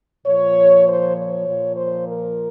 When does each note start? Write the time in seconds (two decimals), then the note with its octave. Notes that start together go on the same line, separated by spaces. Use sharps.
0.25 A#2 F3 C#5
0.86 C5
1.16 C#5
1.46 A#2 F3
1.76 C5
2.07 A#4